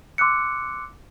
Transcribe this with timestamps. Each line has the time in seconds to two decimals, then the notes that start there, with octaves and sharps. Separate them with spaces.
0.18 C6 D6 E6 F#6 C#7